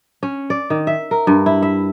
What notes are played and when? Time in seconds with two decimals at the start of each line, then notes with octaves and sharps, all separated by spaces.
0.23 C#4
0.50 D5
0.70 D#3
0.87 E5
1.11 A#4
1.27 G2
1.46 E4
1.62 E5